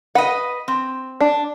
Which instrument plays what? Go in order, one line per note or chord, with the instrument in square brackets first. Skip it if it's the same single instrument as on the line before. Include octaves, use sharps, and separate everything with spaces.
[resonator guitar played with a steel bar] B4 D#5 [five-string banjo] F#5
[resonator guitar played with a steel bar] C4
[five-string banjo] D4